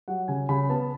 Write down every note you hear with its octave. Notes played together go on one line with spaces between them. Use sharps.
F#3 F#5
C#3 G#5
C#3 B5
B3 A5